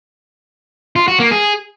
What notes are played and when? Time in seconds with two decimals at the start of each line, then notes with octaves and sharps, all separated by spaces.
0.96 F4
1.08 F#4
1.20 A#3
1.31 G#4